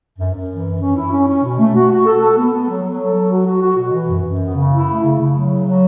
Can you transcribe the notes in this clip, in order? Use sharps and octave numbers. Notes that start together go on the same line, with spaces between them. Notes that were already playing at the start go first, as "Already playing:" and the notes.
F#2
F#2
E3
F#2
C#4
E4
C#4
C#4
B2
A3
F#4
F#4
A4
A4
B3
B3
F#3
F#3
A4
F#3
F#4
F#4
F#4
B2
E3
F#2
F#2
B3
C#3
E4
A3
C#3
C#3
F#3
C#3
F#3